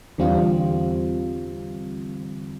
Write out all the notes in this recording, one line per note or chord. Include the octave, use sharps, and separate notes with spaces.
E2 D3 G3 C4 F4